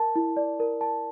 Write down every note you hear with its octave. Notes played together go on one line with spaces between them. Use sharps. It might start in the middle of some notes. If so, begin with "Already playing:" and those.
Already playing: A#4 A5
E4
D5
A#4
A5